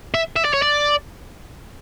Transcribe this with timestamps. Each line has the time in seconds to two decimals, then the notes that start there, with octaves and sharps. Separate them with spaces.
0.14 E5
0.36 E5
0.45 D5
0.53 C#5
0.62 D5